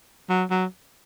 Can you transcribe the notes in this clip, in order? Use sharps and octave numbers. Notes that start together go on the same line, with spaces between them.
F#3
F#3